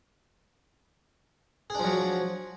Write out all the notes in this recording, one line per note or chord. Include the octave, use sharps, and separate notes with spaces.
F3 F#3 D4 G#4